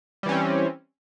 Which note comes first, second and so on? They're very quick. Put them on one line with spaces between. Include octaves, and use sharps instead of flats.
G3 E3 C#4 C4